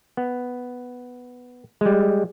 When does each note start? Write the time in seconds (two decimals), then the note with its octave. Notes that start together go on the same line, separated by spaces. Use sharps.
0.17 B3
1.81 G3 G#3